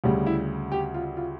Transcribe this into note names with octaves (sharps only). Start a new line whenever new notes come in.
D2 C#3 G3
E4
G4
F4
F4